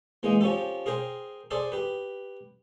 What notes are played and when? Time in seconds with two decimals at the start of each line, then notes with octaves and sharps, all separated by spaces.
0.23 E3 G#3 A#3 D#4
0.41 F3 C#4 G4 A4
0.86 G#4 A#4 C5 G5
1.51 G#4 A4 C5 D5
1.72 G4 B4